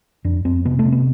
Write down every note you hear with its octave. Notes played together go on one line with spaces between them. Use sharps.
F2 D4
F2 C4
C3 B3
A3
C3
B3